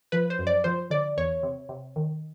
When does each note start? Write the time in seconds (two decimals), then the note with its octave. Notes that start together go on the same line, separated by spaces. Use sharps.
0.12 F3 B4
0.30 C5
0.39 F#2
0.47 D5
0.64 F3 C5
0.90 D3 D5
1.17 E2 C#5
1.43 C3
1.69 C3
1.96 D#3